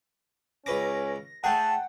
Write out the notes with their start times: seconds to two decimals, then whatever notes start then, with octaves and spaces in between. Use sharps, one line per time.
0.66 C#2 C#4 B4 D6 A#6
1.44 A3 G#4 F#5 G5 A5